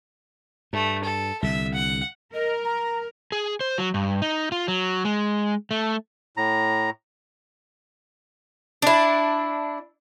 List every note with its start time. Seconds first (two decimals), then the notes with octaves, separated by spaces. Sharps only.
0.73 G2 A3
1.04 A4
1.42 C2 D3 E5
1.74 F#5
2.33 A#4 D#5
2.64 A#5
3.32 G#4
3.61 C5
3.78 F#3
3.94 G2
4.22 D#4
4.52 F4
4.68 F#3
5.05 G#3
5.71 A3
6.37 A2 A#5
8.82 D4 E4